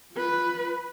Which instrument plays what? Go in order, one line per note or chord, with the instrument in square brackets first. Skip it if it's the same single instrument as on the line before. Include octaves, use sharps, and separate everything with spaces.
[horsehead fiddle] F4 B4